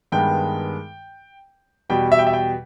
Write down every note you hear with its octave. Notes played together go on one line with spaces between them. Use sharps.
G2 D#3 G#3 B3 G5
E2 B2 G3 B3 G5
E5
G5
E5
G5